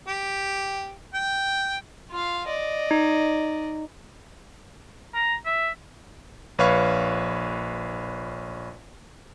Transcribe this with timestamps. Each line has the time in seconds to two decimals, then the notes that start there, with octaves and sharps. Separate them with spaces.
0.08 G4
1.14 G5
2.11 F4 F5
2.47 D5 D#5
2.91 D#4
5.14 A#5
5.46 E5
6.58 A#1 B4 C#5 F5 C#6